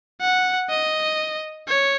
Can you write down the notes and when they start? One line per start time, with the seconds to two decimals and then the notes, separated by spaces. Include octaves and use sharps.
0.21 F#5
0.69 D#5
1.67 C#5